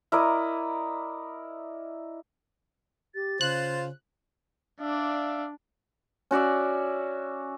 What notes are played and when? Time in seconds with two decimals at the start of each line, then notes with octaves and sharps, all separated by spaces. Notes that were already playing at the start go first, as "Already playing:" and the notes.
0.12 E4 A#4 D5 D#5
3.14 G4 A6
3.41 C#3 F4 C5 F#6
4.80 D4 D5 E5 F5
6.31 C#4 F#4 D5 E5